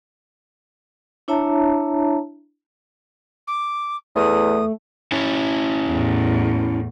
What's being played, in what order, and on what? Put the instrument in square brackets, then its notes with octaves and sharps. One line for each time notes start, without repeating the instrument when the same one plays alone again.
[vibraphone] D4 E4 C#5 E5 A5 A#5
[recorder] D6
[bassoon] E2 [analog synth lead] A3 [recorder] D#6
[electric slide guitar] C#4 E4 C#5
[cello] E2 A2